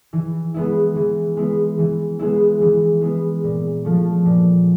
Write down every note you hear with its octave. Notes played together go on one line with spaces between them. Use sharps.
E3
G#3 B3 E4
E3
G#3 B3 E4
E3
G#3 B3 E4
E3
G#3 B3 E4
A#2
F3 A3
A#2